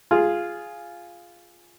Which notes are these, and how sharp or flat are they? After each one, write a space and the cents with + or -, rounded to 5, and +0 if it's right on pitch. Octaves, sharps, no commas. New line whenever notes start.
F4 -5 G#4 +0